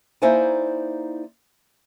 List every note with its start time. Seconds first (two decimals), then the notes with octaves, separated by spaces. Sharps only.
0.22 A#3 D#4 E4 C5 D5 G#5